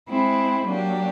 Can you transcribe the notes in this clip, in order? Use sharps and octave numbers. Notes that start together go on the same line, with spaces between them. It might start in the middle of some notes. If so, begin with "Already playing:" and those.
G#3 C4 E4
F#3 A#3 D4 G4